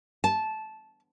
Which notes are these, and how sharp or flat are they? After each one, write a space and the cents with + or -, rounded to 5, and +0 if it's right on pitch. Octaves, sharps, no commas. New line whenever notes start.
A5 -15